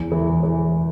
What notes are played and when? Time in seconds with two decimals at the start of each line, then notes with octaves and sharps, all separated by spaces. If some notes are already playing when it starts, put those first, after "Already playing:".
Already playing: E2
0.12 E3
0.43 E3